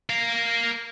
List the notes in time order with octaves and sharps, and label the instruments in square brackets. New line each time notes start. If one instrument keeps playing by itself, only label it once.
[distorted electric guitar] A#4 F5